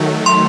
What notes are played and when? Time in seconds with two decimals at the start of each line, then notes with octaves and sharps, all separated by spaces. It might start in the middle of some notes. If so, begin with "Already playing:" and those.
Already playing: D#3 F#3 A3
0.26 C6